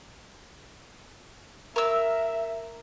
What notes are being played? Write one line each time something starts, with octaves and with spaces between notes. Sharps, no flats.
A#4 E5 E6